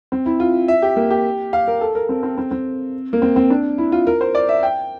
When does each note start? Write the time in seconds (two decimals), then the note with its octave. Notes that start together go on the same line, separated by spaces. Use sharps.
0.12 C4
0.26 E4
0.40 F4
0.68 E5
0.82 G4
0.96 A#3
1.11 G4
1.53 F5
1.67 A#4
1.81 A4
1.95 A#4
2.09 C4
2.23 C4
2.38 C4
2.51 C4
3.13 A#3
3.22 C4
3.36 C4
3.50 D4
3.78 E4
3.92 F4
4.07 A#4
4.21 C5
4.35 D5
4.49 E5
4.63 G5